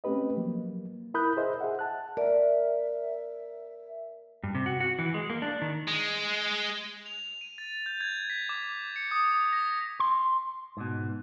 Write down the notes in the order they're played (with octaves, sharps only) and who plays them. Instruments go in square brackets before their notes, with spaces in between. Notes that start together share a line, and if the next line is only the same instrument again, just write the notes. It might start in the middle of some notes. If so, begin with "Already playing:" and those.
[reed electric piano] A3 C4 C#4 G4 B4 D#5
F3 F#3 A#3
E4 A#4 B5 D#6 F#6 G6
G#4 C5 D#5 E5
G#4 E5 F#5
F#5 A5 F#6
[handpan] A#4 [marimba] D5 [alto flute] E5
[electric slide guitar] G2
C3
F#4
F#4
E3
G#3
A#3
D4
D#3
[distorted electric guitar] G#3
[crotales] F7
D#7
A6
G6
G#6
B6
D6
C#7
D#6
D#6
A#6
[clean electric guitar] C6
G#2 B2